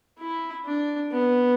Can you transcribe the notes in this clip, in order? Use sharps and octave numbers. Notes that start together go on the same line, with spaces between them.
E4
D4
B3